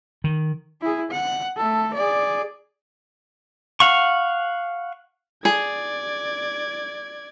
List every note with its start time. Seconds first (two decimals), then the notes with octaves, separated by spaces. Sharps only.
0.24 D#3
0.82 E4 G#4
1.11 F#5
1.57 A3 A4
1.94 G#4 D5
3.80 F5 F#5 C#6
5.45 G#4 D5 G#6